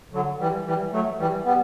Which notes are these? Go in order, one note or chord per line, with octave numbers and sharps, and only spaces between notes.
D3 F#3
E3 G3
E3 G3
F#3 A3
E3 G3
G3 B3